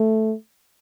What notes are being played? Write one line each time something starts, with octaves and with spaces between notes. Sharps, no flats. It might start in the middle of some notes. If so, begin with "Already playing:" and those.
Already playing: A3